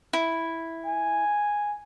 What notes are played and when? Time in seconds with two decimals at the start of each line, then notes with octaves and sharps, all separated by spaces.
0.13 E4
0.86 G#5